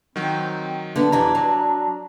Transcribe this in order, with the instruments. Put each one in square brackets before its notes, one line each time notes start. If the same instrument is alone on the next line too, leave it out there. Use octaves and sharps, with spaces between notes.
[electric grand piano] D#3 F#3 [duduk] C4
[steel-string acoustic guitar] D3 B3 [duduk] D4
[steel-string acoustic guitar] F2 E3 G4 [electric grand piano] A#5
[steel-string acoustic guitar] F#3